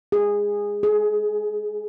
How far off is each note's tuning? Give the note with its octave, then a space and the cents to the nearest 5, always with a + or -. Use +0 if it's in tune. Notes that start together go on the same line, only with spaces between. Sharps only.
G#4 -15
G#4 +25